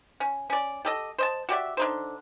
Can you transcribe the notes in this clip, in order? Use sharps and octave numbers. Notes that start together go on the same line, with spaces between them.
C#4
C#4 D5
G4 A4 D#5
C5 D#5 A5
F#4 G4 D5 E5
D3 D#4 C5